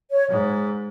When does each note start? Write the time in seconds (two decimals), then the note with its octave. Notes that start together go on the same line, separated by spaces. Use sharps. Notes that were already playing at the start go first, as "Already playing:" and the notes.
0.11 C#5
0.29 G#2